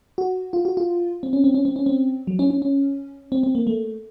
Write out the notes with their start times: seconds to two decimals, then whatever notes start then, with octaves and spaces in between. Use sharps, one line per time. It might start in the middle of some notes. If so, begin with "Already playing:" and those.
0.18 F#4
0.53 F4
0.65 F#4
0.77 F4
1.23 C4
1.33 C#4
1.44 C4
1.54 C#4
1.65 C4
1.76 C#4
1.86 C4
2.27 F#3
2.39 C#4
2.50 C#4
2.62 C#4
3.32 C4
3.43 C4
3.55 A#3
3.67 A3